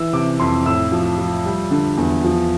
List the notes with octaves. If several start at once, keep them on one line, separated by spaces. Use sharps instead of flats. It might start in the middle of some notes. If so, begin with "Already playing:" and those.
Already playing: E3 E6
C3 D6
F2 C6
A2 E6
F3
F3
G3
D3
E2
F3